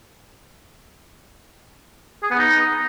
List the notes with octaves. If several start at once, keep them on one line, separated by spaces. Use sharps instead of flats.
G#4
B3
D#4